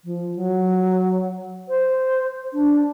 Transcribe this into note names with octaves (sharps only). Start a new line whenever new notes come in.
F3
F#3
C5
D4